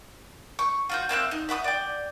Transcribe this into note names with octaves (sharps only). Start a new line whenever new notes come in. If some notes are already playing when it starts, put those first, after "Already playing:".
C#6
F4 F#4 G6
A#3 C4 E5 F#6
D#4
E5 F#5 C6 D#6
D5 G5